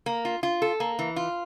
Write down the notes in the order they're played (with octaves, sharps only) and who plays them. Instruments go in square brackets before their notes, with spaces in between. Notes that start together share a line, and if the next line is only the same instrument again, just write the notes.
[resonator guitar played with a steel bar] A#3
F4
F4
A4
A#3
E3
F4